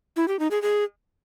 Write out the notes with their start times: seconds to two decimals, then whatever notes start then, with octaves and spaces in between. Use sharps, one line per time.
0.17 E4
0.28 G4
0.39 D#4
0.51 G#4
0.62 G#4